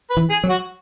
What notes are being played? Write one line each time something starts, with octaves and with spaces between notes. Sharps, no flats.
B4
E3
G#4
F#3
F#4